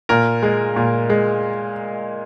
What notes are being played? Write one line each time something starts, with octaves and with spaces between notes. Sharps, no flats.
A#2 A#4
G#3
A#2
G#3